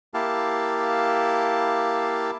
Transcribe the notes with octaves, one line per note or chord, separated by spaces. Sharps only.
A#3 E4 G4 F5 A5